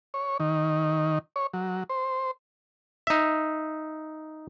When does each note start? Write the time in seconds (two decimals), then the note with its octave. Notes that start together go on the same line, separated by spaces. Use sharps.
0.14 C#5
0.40 D#3
1.36 C#5
1.53 F#3
1.89 C5
3.07 D#4 E5